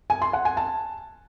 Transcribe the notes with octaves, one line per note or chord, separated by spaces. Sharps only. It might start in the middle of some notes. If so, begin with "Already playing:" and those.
G#5
C6
F#5
G#5
A5